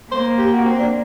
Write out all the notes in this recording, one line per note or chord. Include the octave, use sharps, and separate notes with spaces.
A#3 C5
G4
F#4
C4
D4